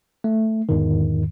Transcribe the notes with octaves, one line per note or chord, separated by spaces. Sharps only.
A3
E2 G#2 D3 D#3